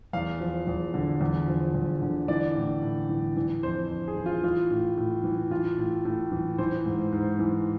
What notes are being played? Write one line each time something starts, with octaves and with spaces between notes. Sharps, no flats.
E2 F5
F3
E2
D3
E2
F3
E2
D3
E3 D5
A2
A2
E3
E3
F2 C5
F2
G#4
E3
F4
E3 F4
A2
A2
E3
E3 F4
A2
A2
E3
E3 C5
G#2
G#2
E3